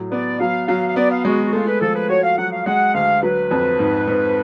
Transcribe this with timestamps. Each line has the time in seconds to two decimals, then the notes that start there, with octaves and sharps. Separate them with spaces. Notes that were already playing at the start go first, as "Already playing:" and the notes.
Already playing: A2 F#3
0.12 B3 D5
0.40 F#3 F5
0.68 F#3 F5
0.88 F5
0.96 B3 D5
1.11 F5
1.25 G#3 F#4
1.46 F#4
1.53 A3 F4
1.67 B4
1.81 F3 A4
1.95 B4
2.09 F#4 C#5
2.23 F5
2.38 F#3 F#5
2.51 F5
2.66 G#3 F#5
2.94 D2 F5
3.23 F#3 B4
3.51 F2
3.79 G#2
4.07 G#2